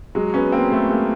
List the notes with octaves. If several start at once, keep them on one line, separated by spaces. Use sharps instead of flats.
F#3 G#3
B3 C#4
A#3 C4
A3 B3
G#3 A#3